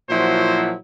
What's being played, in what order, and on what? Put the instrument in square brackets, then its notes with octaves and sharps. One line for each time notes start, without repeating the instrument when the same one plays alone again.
[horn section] A#2 F3 F#3 E4 F#4 C5